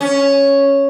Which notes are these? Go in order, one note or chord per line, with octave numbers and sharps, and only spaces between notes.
C#4